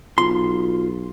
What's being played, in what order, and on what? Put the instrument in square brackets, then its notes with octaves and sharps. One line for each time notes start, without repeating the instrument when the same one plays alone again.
[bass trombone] B1 [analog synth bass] F4 [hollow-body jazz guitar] C6